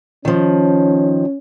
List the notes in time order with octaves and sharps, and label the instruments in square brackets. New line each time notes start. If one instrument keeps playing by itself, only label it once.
[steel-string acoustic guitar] D#3 F3 [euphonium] C#4